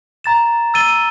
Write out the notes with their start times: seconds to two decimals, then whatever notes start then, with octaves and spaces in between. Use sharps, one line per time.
0.24 A#5 A6 E7
0.74 E6 A6 D#7 G7